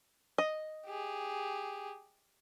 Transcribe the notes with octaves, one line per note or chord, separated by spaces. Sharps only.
D#5
G4 G#4